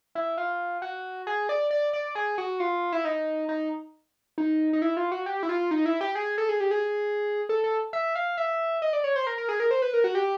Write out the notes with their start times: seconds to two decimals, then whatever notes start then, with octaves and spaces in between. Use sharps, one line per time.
0.15 E4
0.38 F4
0.82 F#4
1.27 G#4
1.49 D5
1.71 D5
1.93 D5
2.15 G#4
2.38 F#4
2.60 F4
2.92 E4
3.05 D#4
3.49 D#4
4.38 D#4
4.73 D#4
4.82 E4
4.97 F4
5.12 F#4
5.26 G4
5.43 E4
5.49 F4
5.71 D#4
5.86 E4
6.01 G4
6.15 G#4
6.38 A4
6.49 G#4
6.60 G4
6.71 G#4
7.49 A4
7.64 A4
7.93 E5
8.15 F5
8.37 E5
8.82 D#5
8.93 D5
9.04 C#5
9.16 C5
9.27 A#4
9.38 A#4
9.49 G#4
9.60 A#4
9.71 C5
9.82 B4
9.93 A#4
10.04 F#4
10.15 G4